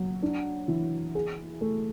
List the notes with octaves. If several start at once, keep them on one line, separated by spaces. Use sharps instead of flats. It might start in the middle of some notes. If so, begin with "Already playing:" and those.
Already playing: F#3
D4
E3
G#4
A3